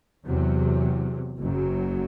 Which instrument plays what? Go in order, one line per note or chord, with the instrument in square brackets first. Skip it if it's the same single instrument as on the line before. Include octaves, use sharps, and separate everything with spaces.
[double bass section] E2 C3 F#3
F#1 F#2 F#3